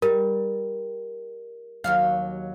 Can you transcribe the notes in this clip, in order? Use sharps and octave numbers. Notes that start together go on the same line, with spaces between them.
G3 A#4
D#2 F#3 F5